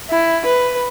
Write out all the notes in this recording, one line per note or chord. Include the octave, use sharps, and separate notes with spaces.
E4
B4